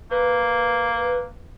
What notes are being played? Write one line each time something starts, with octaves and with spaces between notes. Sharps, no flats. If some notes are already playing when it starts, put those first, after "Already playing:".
A#3 B4